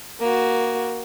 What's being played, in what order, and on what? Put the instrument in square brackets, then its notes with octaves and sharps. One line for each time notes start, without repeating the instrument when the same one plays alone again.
[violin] A#3 F#4